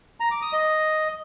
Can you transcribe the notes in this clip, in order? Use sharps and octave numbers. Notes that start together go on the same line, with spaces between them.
A#5
D6
D#6
D#5